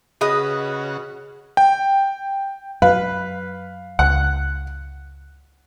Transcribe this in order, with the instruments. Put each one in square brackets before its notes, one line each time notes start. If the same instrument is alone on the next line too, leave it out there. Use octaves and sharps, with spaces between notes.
[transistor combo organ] C#3 F#4 [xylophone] G#4 [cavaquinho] B4 D#5 D#6
[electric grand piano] G5
[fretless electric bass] F#2 [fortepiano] B4 [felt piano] F5
[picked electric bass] C#2 [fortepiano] F#5